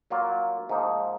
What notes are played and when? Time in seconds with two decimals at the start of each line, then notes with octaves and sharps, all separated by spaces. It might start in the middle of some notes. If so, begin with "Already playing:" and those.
0.10 F#3 A#3 F4 A#4
0.69 G#2 F3 A#3 D#4